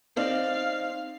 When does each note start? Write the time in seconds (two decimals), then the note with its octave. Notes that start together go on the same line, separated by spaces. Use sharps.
0.17 C4 D#4 D5 F5